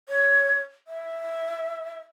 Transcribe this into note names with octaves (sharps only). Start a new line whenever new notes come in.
C#5
E5